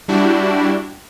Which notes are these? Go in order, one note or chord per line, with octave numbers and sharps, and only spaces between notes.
G3 D4 E4 F#4 G4